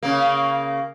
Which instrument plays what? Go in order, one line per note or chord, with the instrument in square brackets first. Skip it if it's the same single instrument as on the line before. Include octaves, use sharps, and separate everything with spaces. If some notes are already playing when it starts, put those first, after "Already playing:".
[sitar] C#3 A#3